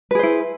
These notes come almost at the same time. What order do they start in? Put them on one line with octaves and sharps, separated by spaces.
B4 G#4 C5 E4